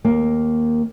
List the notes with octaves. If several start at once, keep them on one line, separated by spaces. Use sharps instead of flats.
D#2 A#3